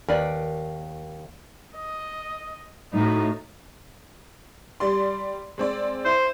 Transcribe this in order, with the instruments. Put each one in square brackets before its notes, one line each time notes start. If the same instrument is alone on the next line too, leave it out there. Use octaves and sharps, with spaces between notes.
[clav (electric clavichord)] D#2 [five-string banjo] A#4 B4 D5
[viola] D#5
[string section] A2 [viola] D#4 F#4
[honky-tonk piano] G3 D5 C6
G#3 C4 D5
[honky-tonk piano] E4 [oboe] C5